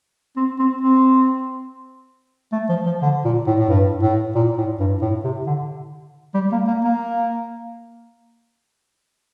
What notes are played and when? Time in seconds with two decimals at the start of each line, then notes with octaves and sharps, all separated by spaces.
0.37 C4
0.59 C4
0.81 C4
2.53 A3
2.69 F3
2.86 F3
3.02 D3
3.25 A#2
3.47 A2
3.60 A2
3.69 G2
4.02 A2
4.35 A#2
4.58 A2
4.80 G2
5.01 A2
5.24 C3
5.47 D3
6.34 G3
6.52 A#3
6.68 A#3
6.84 A#3